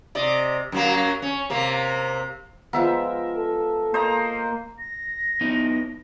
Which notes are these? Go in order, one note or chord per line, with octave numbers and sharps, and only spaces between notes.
C3 D5 D#5
F#2 F#3 A#3
C#4
C3 A#3
F3 G#3 B3 A#4 E5
A4
A#3 C5 D#5 A#5
A#6
B3 D#4 E4